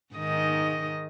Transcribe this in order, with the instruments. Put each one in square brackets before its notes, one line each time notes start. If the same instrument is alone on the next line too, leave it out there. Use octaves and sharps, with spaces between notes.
[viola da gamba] G#2 D#3 D#5